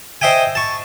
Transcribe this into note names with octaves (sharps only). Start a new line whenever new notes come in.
C5 D#5 E5 G5 G#5
A5 C#6